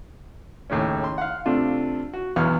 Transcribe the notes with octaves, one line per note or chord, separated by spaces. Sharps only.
D#2 A2 C#3 C#4
C6
F5 F#5
C3 A3 C4 D4 F4
F#4
B1 E2 B3 F5 C#6 F6